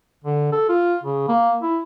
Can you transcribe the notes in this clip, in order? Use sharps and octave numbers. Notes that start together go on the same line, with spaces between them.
D3
A4
F4
C#3
A#3
E4